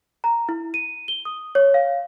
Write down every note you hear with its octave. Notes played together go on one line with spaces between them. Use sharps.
A#5
E4
D#7
G7
D#6
C#5
F5